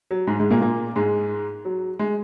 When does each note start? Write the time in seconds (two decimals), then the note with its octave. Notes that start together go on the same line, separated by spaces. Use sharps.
0.11 F#3
0.27 G#2 G#3
0.39 G#2 G#3
0.50 A#2 A#3
0.61 A#2 A#3
0.96 G#2 G#3
1.65 F#3
1.99 G#3